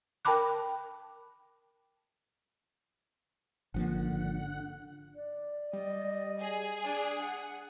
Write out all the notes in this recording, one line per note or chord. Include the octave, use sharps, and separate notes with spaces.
A#4 G5 A5 B5 D6 F#6
G#1 D3 F3 A#3 F#5
D5
G3 D#5
G#4
D4 D#6
F#5